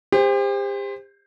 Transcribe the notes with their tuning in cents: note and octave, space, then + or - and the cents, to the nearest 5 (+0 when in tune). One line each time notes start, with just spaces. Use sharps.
G4 +40 C5 +0